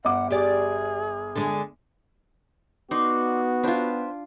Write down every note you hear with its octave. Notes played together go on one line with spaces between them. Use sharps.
G1 F#5 D6
G4 G#4 D5
D3 G#3
B3 D#4 F#4 D5 C6
D4 F4 B4 C5 G5